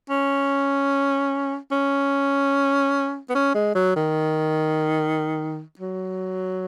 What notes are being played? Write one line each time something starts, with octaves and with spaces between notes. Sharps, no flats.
C#4
C#4
B3
C#4
G#3
F#3
D#3
F#3